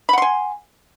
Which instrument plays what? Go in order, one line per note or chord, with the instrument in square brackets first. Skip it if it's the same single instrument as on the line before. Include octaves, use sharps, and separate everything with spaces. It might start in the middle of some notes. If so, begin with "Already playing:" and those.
[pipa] B5
F#5
C6
G#5